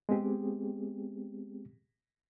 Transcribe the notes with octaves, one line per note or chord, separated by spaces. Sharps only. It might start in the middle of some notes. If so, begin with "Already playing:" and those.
G#3 B3 C4 G4 G#4